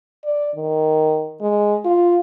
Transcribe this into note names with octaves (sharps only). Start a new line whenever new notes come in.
D5
D#3
G#3
F4